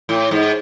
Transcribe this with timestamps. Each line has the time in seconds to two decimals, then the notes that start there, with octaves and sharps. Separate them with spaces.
0.09 A2
0.31 G#2